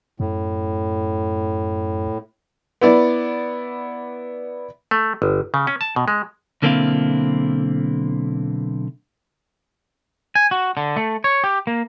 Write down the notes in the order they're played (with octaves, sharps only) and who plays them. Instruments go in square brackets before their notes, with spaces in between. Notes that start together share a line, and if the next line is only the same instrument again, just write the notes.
[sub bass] F#2 [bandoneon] A2
[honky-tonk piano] B3 E4 D5
[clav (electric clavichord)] A3
G1
C#3
C#4
A5
B2
G#3
[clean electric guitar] B1 D3 A#3 C4 E4 F5
G#5
F#4
D3
A3
C#5
G4
A#3